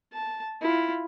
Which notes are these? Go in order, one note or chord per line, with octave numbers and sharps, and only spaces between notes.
A5
E4 F4